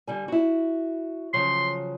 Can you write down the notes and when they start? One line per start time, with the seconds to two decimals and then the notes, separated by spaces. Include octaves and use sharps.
0.07 D3 G3 G#5
0.28 E4 F#4
1.33 C#3 F3 F#3 C6